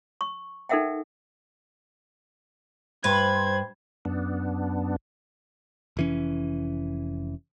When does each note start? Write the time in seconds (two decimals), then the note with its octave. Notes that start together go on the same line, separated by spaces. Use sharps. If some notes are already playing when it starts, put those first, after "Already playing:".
0.21 C#6
0.69 D#4 A4 A#4 E5 F#5 G5
3.04 G2 B4 C5 G#6
4.05 F#2 B3 D4
5.97 F1 E3 C#4